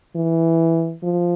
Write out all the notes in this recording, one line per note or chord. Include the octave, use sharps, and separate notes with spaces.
E3
F3